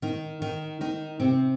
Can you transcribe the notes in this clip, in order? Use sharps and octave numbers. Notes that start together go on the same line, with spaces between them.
D#3 D#4
D#3 D#4
D#3 D#4
C3 C4